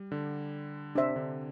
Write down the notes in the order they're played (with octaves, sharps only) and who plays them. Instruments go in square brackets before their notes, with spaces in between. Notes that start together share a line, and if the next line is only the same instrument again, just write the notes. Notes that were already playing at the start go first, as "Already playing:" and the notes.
Already playing: [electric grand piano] G3
D3
[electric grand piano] C3 [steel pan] D4 C5 E5
[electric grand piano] C3
D3